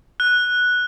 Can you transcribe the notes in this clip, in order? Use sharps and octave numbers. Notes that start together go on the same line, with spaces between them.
F#6